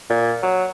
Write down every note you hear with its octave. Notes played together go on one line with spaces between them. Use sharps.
A#2
F#3